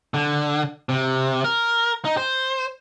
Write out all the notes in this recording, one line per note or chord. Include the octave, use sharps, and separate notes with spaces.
D3
C3
A#4
D#4
C5